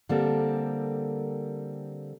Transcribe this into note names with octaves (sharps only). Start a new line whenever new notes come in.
D3 G3 A#3 C4 A4 A#4